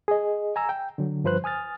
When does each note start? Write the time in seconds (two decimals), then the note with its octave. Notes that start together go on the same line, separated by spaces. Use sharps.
0.08 G#4 D#5
0.56 G#5 A#5 E6
0.69 G5
0.98 D3 F#3
1.24 G2 F3 B4 C5 F#6
1.44 G#5 D#6 F6 A6